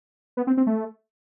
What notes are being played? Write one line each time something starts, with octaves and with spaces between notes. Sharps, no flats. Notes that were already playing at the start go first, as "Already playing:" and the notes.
B3
C4
C4
A3